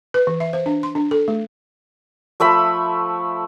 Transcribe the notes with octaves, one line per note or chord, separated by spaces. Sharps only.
B4
E3
E5
C5
D4
C6
D4
A4
A3
F3 A3 E5 B5